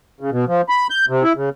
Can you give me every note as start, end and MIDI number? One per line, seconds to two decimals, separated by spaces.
0.20 0.30 49
0.32 0.45 47
0.48 0.62 53
0.69 0.87 83
0.90 1.05 91
1.09 1.23 48
1.23 1.33 64
1.36 1.49 49